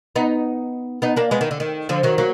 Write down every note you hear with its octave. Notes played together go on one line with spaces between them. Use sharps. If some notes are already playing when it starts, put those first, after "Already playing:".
B3 D#4
B3 D#4
A#3 D4
G#3 B3
D#3
D3
D#3
D3 F3
D#3 F#3
F#3 A#3